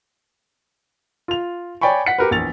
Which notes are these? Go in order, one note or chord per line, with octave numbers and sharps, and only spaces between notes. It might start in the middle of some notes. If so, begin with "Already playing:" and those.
F4 F7
C#5 D5 G5 G#5 B5 C#6
F#5 B6 C#7
G4 A#4 B4
A#1 E2 A6 F7